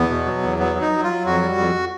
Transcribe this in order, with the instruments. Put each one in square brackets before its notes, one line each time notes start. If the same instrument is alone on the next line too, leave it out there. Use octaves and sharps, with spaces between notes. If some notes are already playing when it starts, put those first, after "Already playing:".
Already playing: [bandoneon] E2 B3
B2
F#3
E2
F#3 B3
F#3
D#4
F#3
F#3 F4
F2 F#4
G3
F2